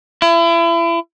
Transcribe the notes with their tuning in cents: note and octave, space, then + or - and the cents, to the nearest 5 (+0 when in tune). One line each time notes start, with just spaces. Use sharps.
E4 +35